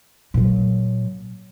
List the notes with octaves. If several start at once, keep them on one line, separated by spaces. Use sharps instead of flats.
A#2 F#3